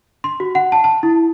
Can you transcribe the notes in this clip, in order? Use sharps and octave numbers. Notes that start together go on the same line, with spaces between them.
C6
F#4
F#5
A5
A5
E4